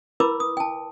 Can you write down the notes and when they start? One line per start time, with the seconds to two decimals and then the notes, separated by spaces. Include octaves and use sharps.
0.20 E4 A#4 B4 B5 D6 E6
0.40 D#6
0.57 G5 A5